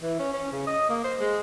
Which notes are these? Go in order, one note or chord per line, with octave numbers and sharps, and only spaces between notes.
E3
C#4
C#4
C#3
D#5
A#3
C5
G#3